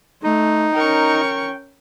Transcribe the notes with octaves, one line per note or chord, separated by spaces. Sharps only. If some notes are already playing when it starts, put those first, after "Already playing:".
A3 D#4
C#4 A#4 G5 C#6